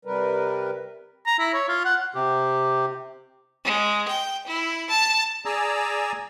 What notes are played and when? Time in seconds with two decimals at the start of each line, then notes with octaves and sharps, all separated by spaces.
0.05 C3 G3 A#4 B4
1.27 A#5
1.39 E4
1.54 C#5
1.69 F4
1.85 F#5
2.15 C3 G4
3.65 G#3
4.08 G5
4.47 E4
4.90 A5
5.45 G#4 D5 G#5 A#5 E6